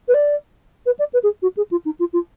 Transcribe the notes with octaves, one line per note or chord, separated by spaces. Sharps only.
B4
D5
B4
D5
B4
G#4
F#4
G#4
F4
D#4
F4
F4